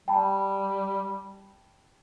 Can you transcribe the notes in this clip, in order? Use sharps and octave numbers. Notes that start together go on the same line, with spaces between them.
G3 G5 A5 B5